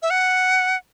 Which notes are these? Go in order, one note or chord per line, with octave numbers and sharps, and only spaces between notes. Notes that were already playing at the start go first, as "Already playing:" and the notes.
E5
F#5